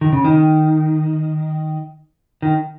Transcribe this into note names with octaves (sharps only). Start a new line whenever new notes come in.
D#3
C#3
D#3
D#3